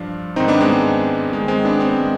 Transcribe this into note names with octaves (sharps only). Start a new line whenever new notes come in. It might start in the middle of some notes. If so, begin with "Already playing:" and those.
Already playing: G2 F3 D4 F4
G#2 D#3 C4 D#4
B3 D4
G#3 C4
G#3
G#2 D#3 G#3
G#3 C4
B3 D4
C4
B3
G#3